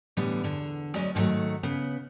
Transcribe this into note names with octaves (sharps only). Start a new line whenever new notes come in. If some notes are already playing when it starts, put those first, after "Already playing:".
A2 D3 E3 G3 B3
E2 D3
D2 F#3 G#3 C#4 D5
G#2 D3 D#3 F#3 A3
C#3 B3